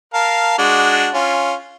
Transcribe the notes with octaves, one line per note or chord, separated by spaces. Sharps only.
A#4 F5 A5
G#3 D4 F#4
C#4 F4